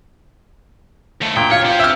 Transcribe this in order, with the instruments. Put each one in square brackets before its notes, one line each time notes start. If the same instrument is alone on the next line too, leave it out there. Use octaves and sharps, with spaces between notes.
[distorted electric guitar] D#2 A3
[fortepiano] A#2 [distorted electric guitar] G5
[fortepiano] F4 [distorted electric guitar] C#5
[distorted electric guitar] C4 G4
[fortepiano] E5 F6